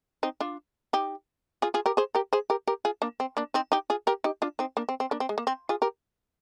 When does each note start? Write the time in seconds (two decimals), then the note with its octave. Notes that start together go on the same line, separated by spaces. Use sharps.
0.23 C4 D#4
0.40 D4 F4
0.93 D#4 G4
1.62 F4 G#4
1.74 F4 G#4
1.86 G4 A#4
1.97 G#4 C5
2.15 G4 A#4
2.33 G#4 C5
2.50 G4 A#4
2.67 G4 A#4
2.85 F4 G#4
3.02 A#3 D4
3.20 C4
3.37 A#3 D4
3.54 C4 D#4
3.72 D#4 G4
3.90 F4 G#4
4.07 G4 A#4
4.24 D#4 G4
4.42 D4 F4
4.59 C4 D#4
4.77 A#3 D4
4.89 C4
5.00 C4
5.11 A#3 D4
5.20 C4
5.29 G#3
5.38 A#3
5.47 C4
5.69 F4 G#4
5.82 G4 A#4